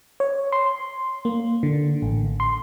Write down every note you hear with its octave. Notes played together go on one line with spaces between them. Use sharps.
C#5
C6
A#3
D3
A1
C6